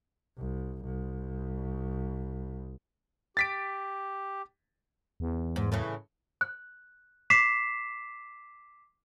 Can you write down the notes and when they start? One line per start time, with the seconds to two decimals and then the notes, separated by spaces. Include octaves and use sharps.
0.38 C2
0.85 C2
3.37 G4 A6 B6 D7
5.20 E2
5.56 G#2
5.72 A2 C#3 E3
6.41 F#6
7.30 D6 B6 C7 E7